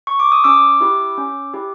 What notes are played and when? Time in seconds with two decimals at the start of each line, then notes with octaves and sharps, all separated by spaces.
0.07 C#6
0.20 D6
0.32 D#6
0.44 C#4 D6 E6
0.81 E4 G4
1.17 C#4
1.54 E4 G4